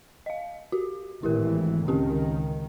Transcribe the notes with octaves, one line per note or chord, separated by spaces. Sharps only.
D#5 F5
F#4 G4
G#1 A2 E3 E4 G4 A#4
C#2 D#3 C4 C#4 G4